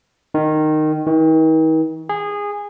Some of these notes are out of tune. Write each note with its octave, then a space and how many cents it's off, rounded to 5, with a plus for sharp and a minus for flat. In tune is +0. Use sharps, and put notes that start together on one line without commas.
D#3 -10
D#3 +45
G#4 -20